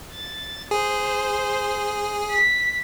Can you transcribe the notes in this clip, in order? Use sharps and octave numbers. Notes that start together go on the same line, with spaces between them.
A6
G#4 C5
B6